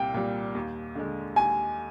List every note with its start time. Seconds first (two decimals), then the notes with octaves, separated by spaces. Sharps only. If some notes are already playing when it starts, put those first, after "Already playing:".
Already playing: C2 A#2 G3 G5
0.14 A#2 G3
0.55 D#2
0.95 D3 G#3
1.36 D#2 G#5